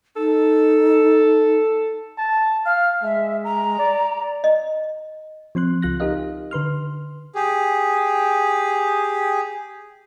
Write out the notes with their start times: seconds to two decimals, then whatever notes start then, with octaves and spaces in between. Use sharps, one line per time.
0.17 D#4 A4
2.18 A5
2.66 F5 F6
3.03 G#3 E5
3.44 A#5
3.78 D5
4.44 D#5
5.55 F3 C4 C6 F#6
5.82 C#2 F4 F#6 A#6
6.00 D#4 G4 A#4 D#5 F5
6.51 D3 B4 C6 F6
7.35 G4 G#4